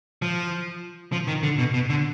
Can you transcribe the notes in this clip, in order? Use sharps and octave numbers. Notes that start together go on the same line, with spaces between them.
F3
F3
D#3
D3
B2
B2
D3